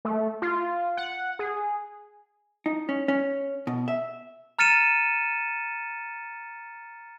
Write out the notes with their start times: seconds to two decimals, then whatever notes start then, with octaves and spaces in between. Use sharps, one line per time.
0.05 A3
0.42 F4
0.97 F#5
1.39 G#4
2.66 D#4
2.89 C#4
3.08 C#4
3.67 B2
3.88 E5
4.59 A#5 F6 A6 C#7 D#7 E7